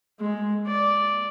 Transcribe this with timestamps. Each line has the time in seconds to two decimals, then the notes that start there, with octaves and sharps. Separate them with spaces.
0.20 G#3
0.66 D5